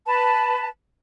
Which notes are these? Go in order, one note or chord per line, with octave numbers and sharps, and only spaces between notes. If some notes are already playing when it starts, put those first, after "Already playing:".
B4 A5